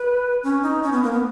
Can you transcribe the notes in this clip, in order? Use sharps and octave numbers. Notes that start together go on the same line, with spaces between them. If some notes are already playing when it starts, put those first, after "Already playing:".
Already playing: B4
C#4
D#4
C#4
B3
A#3
B3